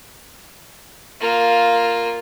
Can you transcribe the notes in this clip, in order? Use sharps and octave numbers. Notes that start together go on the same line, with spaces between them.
A#3 F4